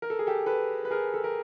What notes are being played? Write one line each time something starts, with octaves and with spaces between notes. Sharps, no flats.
A#4
A4
G#4
G4 A4
A4 B4
B4
G#4 A#4
A4
A#4